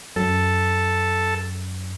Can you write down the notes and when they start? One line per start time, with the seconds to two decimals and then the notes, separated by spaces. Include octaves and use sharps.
0.16 F#2 A4